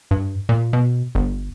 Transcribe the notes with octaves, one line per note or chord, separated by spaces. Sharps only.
G2
A#2
B2
G1